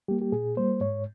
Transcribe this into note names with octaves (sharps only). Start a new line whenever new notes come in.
G3 A#3 G4
G4
A#2 G#4
G3 A#3 C5
G#2 C#5